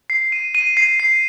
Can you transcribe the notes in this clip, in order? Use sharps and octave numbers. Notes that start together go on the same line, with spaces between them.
C7
D#7
D#7
C7
C7